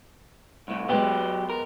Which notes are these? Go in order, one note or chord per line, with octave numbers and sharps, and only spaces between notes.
C2 A2
F#3 G#3 B3 G4
A#4